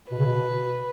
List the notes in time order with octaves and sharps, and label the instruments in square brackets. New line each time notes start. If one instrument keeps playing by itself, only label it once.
[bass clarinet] B2 [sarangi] B4
[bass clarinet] C#3
B2